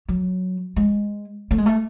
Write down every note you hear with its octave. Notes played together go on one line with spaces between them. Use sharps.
F#3
G#3
A3
G#3
A3